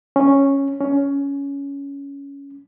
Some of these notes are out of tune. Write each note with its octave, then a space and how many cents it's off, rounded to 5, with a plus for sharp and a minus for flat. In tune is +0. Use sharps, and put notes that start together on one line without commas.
C#4 -5
C#4 +15